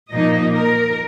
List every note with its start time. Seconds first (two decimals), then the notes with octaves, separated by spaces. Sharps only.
0.11 A#2 F3 A#3 D#4 D#5
0.55 A#4